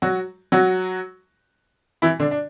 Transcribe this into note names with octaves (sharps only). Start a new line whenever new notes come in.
F#3 F#4
F#3 F#4
E3 E4
D3 D4
D4